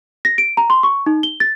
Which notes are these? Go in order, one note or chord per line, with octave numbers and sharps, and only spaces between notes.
A#6
D7
A#5
C6
C#6
D#4
G7
A6